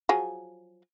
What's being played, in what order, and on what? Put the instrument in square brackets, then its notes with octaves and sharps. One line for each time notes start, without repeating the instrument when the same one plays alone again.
[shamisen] F3 F#3 G#4